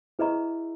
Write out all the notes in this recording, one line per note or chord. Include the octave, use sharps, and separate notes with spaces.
E4 G#4 B4 D#5 A#5 C#6